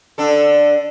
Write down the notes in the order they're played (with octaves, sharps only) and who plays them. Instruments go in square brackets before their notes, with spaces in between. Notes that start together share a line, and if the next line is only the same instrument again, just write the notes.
[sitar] D3 D4 A4